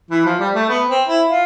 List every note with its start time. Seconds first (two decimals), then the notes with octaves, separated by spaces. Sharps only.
0.11 E3
0.25 F3
0.39 G3
0.55 A3
0.69 B3
0.89 C4
1.08 E4
1.28 F4